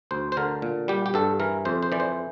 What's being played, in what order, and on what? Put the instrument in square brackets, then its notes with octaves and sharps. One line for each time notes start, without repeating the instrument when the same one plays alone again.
[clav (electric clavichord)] D2 C5
C5
D3 A#4
A#2
G3 G4
G4
G2 A4
E3 A#4
F2 C5
C5
E3 D5
C5